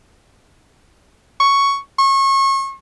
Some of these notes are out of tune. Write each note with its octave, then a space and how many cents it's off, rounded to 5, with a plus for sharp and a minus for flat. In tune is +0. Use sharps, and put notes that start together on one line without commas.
C#6 +5
C#6 -30